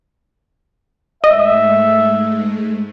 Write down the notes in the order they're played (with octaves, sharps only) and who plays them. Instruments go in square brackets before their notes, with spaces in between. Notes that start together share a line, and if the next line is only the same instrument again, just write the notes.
[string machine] G#2 G#3 A3 [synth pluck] D#5 [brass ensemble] E5